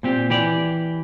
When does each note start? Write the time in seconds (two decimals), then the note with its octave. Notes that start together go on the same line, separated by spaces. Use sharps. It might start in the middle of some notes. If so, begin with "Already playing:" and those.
0.03 A#2 C4 G4
0.30 E3 G4 D5